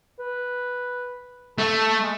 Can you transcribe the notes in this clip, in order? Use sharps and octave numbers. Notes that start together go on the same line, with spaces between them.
B4
A3 A4
G#3